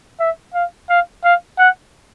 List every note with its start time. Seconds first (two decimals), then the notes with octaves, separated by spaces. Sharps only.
0.20 E5
0.54 F5
0.90 F5
1.24 F5
1.59 F#5